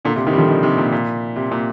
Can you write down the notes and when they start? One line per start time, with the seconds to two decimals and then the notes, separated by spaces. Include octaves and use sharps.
0.05 A#2 D3
0.16 C3
0.27 C3 D#3
0.33 G3
0.37 D3 F3
0.48 C3 D#3
0.63 C3 D#3
0.78 A#2
0.92 A#2
1.36 C3
1.51 A#2